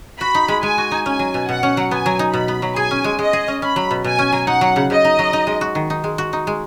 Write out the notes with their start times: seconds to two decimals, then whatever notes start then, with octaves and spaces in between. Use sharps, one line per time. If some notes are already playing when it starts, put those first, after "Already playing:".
0.20 F#4 B5
0.35 D#4
0.48 G#3
0.63 G#3 G#5
0.78 F#4
0.91 D#4
1.06 C#4 G#5
1.19 F#3
1.34 B2
1.49 B2 F#5
1.63 C#4
1.77 F#3
1.91 B3 G#5
2.06 F#3
2.19 D#4
2.34 B2 B5
2.48 B3
2.62 F#3
2.76 G#4 G#5
2.91 C#4
3.04 G#3
3.19 G#3 D#5
3.33 G#4
3.48 C#4
3.62 C#4 B5
3.76 F#3
3.91 B2
4.04 B2 G#5
4.19 C#4
4.32 F#3
4.47 D#4 F#5
4.61 F#3
4.76 C#3
4.90 C#3 D#5
5.05 D#4
5.19 F#3
5.33 D#4
5.47 G#3
5.61 F#4
5.75 D#3
5.90 D#4
6.04 G#3
6.18 F#4
6.33 D#4
6.47 G#3